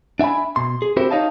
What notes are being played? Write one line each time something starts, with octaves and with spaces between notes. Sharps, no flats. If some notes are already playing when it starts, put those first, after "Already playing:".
D4 E5 F#5 G#5 B5
B2 C6
G#4
C4 E4 F#4 G4 A#4 C5
D#4 C#5 D#5 F5 A5